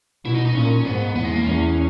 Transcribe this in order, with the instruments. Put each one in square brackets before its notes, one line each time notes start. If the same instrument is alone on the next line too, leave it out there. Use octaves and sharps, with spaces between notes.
[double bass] B2 [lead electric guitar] E4
[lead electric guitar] D#4
D#4
[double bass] A#2 [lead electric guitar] C#4
[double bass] G#2 [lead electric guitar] B3
[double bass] E2 [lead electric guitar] B3
[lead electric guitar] G#3
A#3
[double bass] E2 [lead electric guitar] C#4